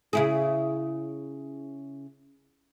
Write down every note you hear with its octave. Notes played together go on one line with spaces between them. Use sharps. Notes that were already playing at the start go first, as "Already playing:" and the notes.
C#3 E4 G#4